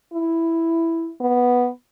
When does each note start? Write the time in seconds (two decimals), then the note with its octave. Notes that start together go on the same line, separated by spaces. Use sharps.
0.13 E4
1.21 B3